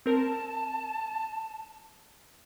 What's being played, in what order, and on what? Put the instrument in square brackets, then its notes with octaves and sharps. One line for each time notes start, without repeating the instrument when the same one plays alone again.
[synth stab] C4 A#4 [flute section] A5